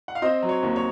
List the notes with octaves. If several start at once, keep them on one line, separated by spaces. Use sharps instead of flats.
F#5
F5
C4 C5 D#5
F#3
C#5
D#2
C#5